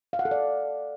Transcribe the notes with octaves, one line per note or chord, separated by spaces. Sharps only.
F5
F#5
A4
D5